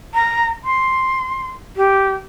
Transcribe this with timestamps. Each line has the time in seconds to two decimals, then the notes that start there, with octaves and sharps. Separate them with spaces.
0.14 A#5
0.64 C6
1.76 G4